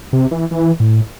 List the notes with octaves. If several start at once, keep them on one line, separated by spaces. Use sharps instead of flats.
C3
E3
E3
A2